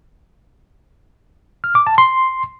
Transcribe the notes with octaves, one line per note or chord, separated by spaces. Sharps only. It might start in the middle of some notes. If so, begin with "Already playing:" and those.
F6
D6
A5
C6